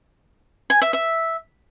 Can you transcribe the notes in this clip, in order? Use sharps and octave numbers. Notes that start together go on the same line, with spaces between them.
G#5
E5
E5